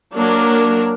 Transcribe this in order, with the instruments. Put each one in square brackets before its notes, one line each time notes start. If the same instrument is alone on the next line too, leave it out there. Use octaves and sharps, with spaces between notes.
[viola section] F#3 A#3 D4 A#4